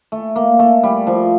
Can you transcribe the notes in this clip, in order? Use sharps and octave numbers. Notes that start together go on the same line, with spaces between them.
A3
A#3
A3
G3
F3